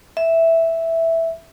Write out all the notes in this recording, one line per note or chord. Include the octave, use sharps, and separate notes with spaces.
E5